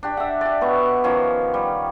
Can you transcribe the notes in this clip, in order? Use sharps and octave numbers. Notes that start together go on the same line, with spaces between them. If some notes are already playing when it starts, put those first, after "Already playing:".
D4 G4
E5 F#5
G4 D5
B2 B3 C#6
D#3 F3 C#4
G3